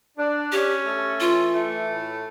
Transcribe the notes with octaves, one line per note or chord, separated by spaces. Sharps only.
D4
C#4 G4
A3
E3 F4
A3
A2